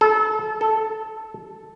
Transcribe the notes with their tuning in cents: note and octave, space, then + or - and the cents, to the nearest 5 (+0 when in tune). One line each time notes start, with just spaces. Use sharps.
A4 -30
A4 +0